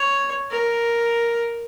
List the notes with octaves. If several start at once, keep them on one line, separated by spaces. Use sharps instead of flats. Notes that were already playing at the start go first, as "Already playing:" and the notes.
Already playing: C#5
A#4